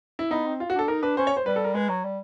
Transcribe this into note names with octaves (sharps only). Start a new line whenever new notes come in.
E4
B3 D#4
C4
F4
F#4
D4 A4
D#4 A#4
D4 B4
C#4 C5
C#5
C5
G3 B4
A4
A#4
G#3 B4
F#3
G3